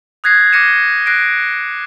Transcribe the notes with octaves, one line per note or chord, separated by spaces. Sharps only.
D#6 F#6 G#6 A#6 C7
D6 F6 A#6 C#7 D#7 E7
F#6 A#6 C7 D7